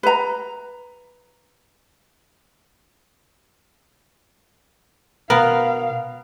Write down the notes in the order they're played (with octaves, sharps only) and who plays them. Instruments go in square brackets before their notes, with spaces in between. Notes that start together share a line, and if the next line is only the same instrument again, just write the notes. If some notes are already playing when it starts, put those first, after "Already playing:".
[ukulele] B4 A#5
[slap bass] B2 [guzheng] B3 [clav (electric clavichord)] A#4 [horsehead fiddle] F5